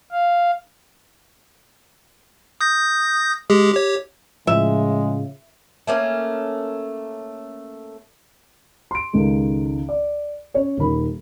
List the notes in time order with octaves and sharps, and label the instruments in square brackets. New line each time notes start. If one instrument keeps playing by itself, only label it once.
[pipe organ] F5
[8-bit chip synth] D#6 G6 A#6
G#3 G4 G#4
G4 C#5
[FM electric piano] A2 F3 [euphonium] C#3 [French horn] G#3 [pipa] E5
[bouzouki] A3 A#3 C#4
[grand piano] C6 D7
C#2 D#3 G#3 D#4 A4
D5
C#4 C#5
D#1 D#3 B5